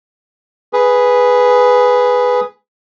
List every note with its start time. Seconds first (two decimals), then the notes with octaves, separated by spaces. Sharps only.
0.73 G#4 B4